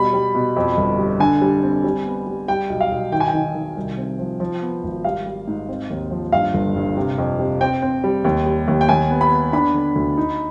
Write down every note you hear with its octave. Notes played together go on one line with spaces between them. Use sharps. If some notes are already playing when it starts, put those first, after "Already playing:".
Already playing: B2 G3 B5
G3
B2
F2
G1
G3
D3 G#5
G3
C4
G3
B3
G3
G3 G5
B1
F5
B1
D#3 G5
G#5
G5
D#3
D#3
C2
C4
F3
F3
B3
G#1
G3 F5
G3
G#2
C4
D#2
F3
G2 F5
G1
G2
C3
F2
C3
C4 G5
C4
G3
D#2
G3
D#2
G5
D#2 G#5
B3
B5
B3
D4 B5
D3
D2
D#4